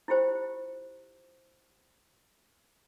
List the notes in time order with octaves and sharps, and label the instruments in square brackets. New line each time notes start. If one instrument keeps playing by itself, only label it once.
[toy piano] E4 F4 G4 C5